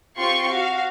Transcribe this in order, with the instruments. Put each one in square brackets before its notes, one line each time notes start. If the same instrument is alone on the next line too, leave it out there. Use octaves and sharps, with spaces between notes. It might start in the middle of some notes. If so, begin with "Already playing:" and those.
[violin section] C4 F4 G4 C6 C#6
F#4 F5